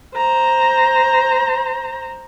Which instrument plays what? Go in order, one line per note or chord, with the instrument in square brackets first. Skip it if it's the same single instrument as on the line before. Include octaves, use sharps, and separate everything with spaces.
[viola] C5 A#5